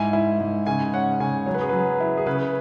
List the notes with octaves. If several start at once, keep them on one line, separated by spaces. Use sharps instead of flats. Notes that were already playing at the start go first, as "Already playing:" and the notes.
Already playing: G#2 E4 G#5
E4
G#2
C#3 G#5
C#4 F#5
C#3 G#5
F#3 C#5
B4
G#4
F#3 B4
E4
G#4
C#3 B4